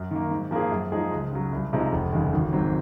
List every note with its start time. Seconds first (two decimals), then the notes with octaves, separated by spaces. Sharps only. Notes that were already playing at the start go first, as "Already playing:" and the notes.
Already playing: F#2
0.11 D#3 A#3
0.31 G#2
0.51 F3 A#3 F4 G#4
0.71 F#2
0.92 F3 G#3 D#4 G#4
1.12 C#2
1.32 C#3 F#3
1.52 C2
1.73 C3 F3 G#3 D#4
1.92 F1
2.13 D#2 C#3 G#3
2.33 G#1
2.53 G#2 F#3 C4